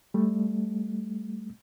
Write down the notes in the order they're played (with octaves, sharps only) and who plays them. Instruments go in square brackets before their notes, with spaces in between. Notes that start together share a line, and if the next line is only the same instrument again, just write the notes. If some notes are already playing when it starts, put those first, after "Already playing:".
[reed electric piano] G3 A3